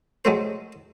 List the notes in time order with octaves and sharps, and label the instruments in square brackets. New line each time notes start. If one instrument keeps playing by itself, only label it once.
[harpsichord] F#3 G#3 A3 C5